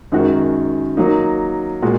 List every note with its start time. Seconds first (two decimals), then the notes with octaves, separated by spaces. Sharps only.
0.12 F#2 D#3 G#3 F#4
0.97 F#3 A#3 D#4
1.82 A#2 G#3 F#4